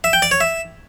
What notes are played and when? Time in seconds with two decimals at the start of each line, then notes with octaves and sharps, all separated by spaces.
0.04 E5
0.13 G5
0.22 D5
0.31 C#5
0.41 E5